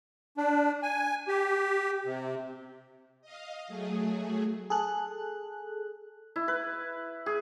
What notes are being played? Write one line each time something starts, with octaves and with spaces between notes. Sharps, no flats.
D4
G#5
G4
C3
D#5 F5
F#3 A3 G#4
G#4 A4 F#6
E4
B4
G#4